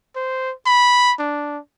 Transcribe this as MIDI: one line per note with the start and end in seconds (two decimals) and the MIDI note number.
0.16 0.52 72
0.66 1.13 83
1.19 1.58 62